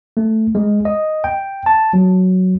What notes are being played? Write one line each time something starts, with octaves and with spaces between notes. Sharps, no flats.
A3
G#3
D#5
G5
A5
F#3